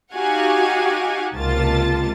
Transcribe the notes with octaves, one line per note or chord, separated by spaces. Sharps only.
D#4 F#4 G4 F5 F#5 G#5
C#2 C3 A#3 F4 A5 A6